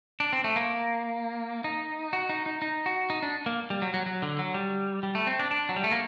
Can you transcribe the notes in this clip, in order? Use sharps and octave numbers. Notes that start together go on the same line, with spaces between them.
D4
C4
A3
A#3
D#4
F#4
D#4
D#4
D#4
F#4
D#4
D4
A#3
G3
F#3
F#3
F#3
D3
F#3
G3
G3
A3
C4
D4
D4
F#3
G3
A3
A#3